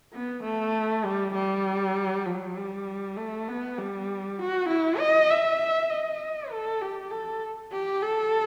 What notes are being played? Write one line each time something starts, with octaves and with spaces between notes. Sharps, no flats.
B3
A3
G3
G3
F#3
G3
A3
B3
G3
F#4
E4
D#5
E5
D#5
A4
G4
A4
G4
A4